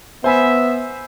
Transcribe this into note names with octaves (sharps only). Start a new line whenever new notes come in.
B3 C5 E5 G#5 B5